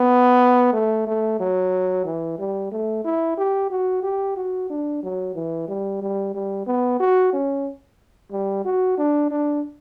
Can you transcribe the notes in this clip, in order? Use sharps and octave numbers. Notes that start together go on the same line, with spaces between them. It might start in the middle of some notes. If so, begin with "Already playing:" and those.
Already playing: B3
A3
A3
F#3
E3
G3
A3
E4
G4
F#4
G4
F#4
D4
F#3
E3
G3
G3
G3
B3
F#4
C#4
G3
F#4
D4
D4